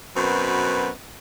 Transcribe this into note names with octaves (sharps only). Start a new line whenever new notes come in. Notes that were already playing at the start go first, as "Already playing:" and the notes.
F#2 B2 C4 B4